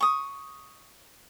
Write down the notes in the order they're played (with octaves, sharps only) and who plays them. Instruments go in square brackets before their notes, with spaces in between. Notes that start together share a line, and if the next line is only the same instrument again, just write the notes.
[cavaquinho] C#6 D#6